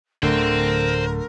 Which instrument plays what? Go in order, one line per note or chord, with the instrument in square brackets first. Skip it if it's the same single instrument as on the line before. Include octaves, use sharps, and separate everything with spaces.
[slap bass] D1 [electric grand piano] D3 A3 [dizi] A#4 [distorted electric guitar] C5 G5